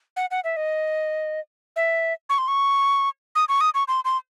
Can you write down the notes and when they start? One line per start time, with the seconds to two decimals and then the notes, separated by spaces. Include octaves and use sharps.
0.17 F#5
0.31 F#5
0.44 E5
0.57 D#5
1.76 E5
2.30 C#6
2.38 C6
2.48 C#6
3.35 D#6
3.49 C#6
3.61 D#6
3.74 C#6
3.88 C6
4.05 C6